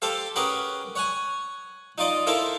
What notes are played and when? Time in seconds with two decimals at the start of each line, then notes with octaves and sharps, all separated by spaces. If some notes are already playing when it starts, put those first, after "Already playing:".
0.02 G4 A4 C5 F5
0.36 C#4 G4 G#4 A#4 B4 F#5
0.95 C#5 F#5 G#5
1.98 D#4 F4 D5 D#5
2.27 E4 A4 A#4 C5 F5